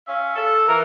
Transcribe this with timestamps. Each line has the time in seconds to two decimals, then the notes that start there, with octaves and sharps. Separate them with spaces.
0.07 C#4 E5 F5
0.36 A4
0.68 E3 A#4